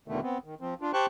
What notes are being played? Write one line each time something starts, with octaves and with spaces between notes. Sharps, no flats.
E2 B2 D3 D#3 A3
B3 C4
D#3
F3 C4
D4 F4
G4 C5 G5 A5 C#6 F#6